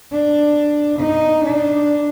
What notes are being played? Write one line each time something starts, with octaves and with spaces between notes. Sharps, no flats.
D4
D#4
D4